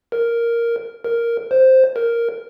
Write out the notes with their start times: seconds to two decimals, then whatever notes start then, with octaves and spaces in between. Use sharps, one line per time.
0.12 A#4
1.04 A#4
1.51 C5
1.96 A#4